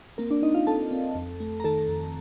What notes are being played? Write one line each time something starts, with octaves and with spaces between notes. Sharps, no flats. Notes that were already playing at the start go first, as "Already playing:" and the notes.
A#3 C4 A#4
D4 D5
C4 D#4 D#5
F4 F5
C4 A4 A5
C4
F2
A3
A#5
D#3 A4 A5
F2